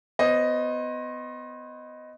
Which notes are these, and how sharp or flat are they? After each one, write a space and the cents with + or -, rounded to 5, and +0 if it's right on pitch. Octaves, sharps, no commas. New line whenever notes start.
B3 +25 C5 +40 D#5 +0